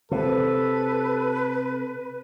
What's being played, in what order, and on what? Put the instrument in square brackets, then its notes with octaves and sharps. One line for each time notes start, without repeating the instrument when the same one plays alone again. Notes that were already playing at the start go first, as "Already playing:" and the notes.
[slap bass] C3 [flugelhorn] A4 [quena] B4